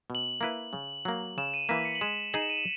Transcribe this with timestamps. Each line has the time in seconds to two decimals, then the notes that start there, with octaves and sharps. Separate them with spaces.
0.10 B2
0.15 F#7
0.41 A#3 E4 B4
0.73 C#3
1.05 F#3 A#3
1.38 C#3 E7
1.54 D#7
1.69 E3 A#3 B6
1.85 C#7
1.95 F#7
2.01 G#3 E7
2.33 D#4 G#4 D#5 F#7
2.42 E7
2.50 D#7
2.57 E7